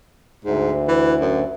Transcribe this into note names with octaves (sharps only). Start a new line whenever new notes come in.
D2 G#2
E3
F#2